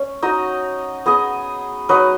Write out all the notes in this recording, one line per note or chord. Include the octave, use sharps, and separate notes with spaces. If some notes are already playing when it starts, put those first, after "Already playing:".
Already playing: C#4
D#4 F#4 D#5
B3 G#4 D#5
F#3 D#4 B4 D#5